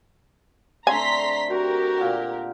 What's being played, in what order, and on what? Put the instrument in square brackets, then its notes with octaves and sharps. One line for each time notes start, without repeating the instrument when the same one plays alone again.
[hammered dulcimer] D3 A3 C4 [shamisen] G#5 [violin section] A#5 C6 B6
[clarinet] F#4 [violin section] G4 A#4 [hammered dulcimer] G5
[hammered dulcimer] A#2 F#5